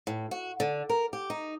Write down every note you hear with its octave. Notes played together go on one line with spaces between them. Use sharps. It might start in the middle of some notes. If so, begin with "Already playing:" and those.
A2
F#4
D3
A#4
G4
D#4